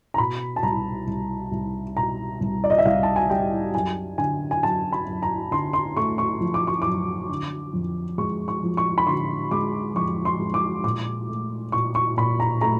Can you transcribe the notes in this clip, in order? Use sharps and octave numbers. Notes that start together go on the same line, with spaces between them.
A#5
B2 B5
A5
C2 A#5
C2
C2
B2 A#5
C2
D5
D#5
E5
C2 F5
A5
G#5
G3 G5
F#2 G#5
D3 G#5
G#5
F#2 A5
B5
F#2
A#5
D3 C6
C6
A3 C#6
C#6
F3
D6
C#6
F#2 D6
D3
F2
G#3 C#6
C#6
F3
C#6
B5
D3 C6
G#3 D6
F2 C#6
C6
G#3
D6
A#2 D6
A3
A#2 C#6
C#6
A#2 B5
A#5
A3 A#5